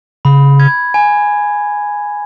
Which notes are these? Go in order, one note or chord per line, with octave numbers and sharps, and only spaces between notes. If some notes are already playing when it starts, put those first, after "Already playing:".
C#3 B5
G#6
G#5